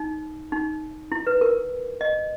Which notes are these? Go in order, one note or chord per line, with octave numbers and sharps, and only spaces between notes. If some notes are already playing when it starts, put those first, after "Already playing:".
Already playing: D#4
D#4
E4
B4
A#4
D#5